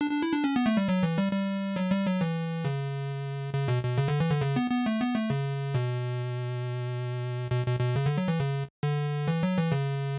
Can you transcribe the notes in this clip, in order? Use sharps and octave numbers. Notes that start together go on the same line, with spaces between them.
D4
D4
E4
D4
C#4
B3
A3
G3
F#3
E3
G3
G3
F#3
G3
F#3
E3
C#3
C#3
B2
B2
C#3
D3
E3
D3
C#3
B3
B3
A3
B3
A3
C#3
B2
B2
B2
B2
C#3
D3
F#3
E3
C#3
D3
E3
F#3
E3
C#3